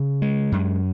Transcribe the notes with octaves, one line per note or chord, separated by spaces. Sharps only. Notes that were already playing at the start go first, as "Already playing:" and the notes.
Already playing: C#3
G#3
F#2